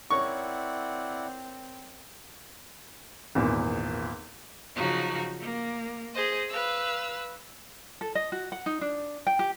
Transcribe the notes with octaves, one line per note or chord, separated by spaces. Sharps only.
C4 E4 A#4 C#5 D5 F#5 C#6
G#1 E2 A#2
C#3 F3 F#3 D#4 F#4
A#3
G#4 C5 D#5
B4 F5 E6
A4
D#5
F#4
F#5
D#4
D4
G5
G4